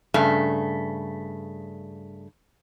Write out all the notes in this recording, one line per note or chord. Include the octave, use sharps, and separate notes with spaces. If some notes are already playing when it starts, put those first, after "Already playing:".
G2 C#3 A3